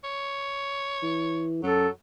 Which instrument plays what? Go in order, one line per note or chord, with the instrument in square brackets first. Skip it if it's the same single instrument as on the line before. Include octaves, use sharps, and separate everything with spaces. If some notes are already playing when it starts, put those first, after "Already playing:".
[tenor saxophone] C#5
[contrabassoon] E3
[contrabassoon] F#2 [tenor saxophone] F#3 [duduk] A4